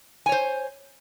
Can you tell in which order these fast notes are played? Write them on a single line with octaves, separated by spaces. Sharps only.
G#5 C#5 C5